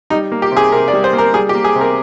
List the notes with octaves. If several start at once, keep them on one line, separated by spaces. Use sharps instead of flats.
G3 D#4
A#3
G4
C3
G#4
C3 A#4
D5
G3
C5
A#3
A#4
G3 G#4
G4
A#3
G#4
C3
A#4